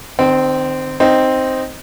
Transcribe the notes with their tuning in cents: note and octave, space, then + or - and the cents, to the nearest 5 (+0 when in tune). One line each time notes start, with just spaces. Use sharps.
D#3 -35 C4 -10
C4 +0 D#4 +0